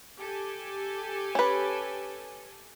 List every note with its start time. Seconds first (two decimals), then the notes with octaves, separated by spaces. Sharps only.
0.18 G4 A4 G#5
1.35 C#4 B4